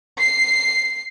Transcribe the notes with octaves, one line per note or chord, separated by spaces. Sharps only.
C7